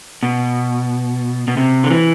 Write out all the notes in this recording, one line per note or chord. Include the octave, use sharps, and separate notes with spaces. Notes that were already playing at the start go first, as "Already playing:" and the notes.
B2
B2
C3
D3
E3